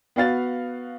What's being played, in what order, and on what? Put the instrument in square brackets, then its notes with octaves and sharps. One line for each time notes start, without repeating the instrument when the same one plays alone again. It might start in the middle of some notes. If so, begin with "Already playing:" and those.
[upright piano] B3 F#4 F5 A6